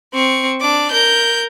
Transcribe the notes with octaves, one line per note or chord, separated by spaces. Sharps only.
C4 C#6
D4 D6
A#4 G6